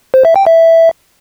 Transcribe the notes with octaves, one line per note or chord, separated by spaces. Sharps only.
C5
E5
G5
E5